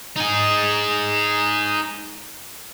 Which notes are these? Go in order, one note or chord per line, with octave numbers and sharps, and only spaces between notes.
D#4 G#4